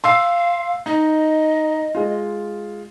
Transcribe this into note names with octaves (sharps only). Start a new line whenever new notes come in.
F5 C6 E6 C7
D#4 D#5
G#3 F4